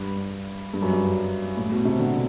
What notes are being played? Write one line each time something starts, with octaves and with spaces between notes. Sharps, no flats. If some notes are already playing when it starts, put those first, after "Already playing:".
Already playing: G2
G2
F#2
G2
A2
B2
C3
D3